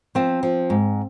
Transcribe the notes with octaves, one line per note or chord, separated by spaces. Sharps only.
F3 C4
F3
G#2